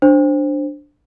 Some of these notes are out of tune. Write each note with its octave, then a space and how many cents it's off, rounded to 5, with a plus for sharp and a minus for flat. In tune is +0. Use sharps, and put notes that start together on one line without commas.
D4 +0 C5 +10